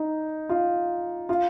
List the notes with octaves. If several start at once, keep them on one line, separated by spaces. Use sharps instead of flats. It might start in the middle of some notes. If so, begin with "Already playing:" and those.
Already playing: D#4
F4
F4